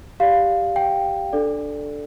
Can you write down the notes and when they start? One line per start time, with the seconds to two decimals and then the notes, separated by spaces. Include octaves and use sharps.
0.20 G4 D5 F5
0.76 G5
1.33 D4 A4 D5